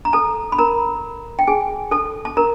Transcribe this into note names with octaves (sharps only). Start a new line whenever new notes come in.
A#5
A4 A5
B5
A#4 A#5
G5
G#4 G#5
A4 A5
A5
A#4 A#5